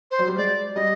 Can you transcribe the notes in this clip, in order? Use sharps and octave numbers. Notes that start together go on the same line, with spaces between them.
C5
F#3
G3
G#3 D5
G3 D#5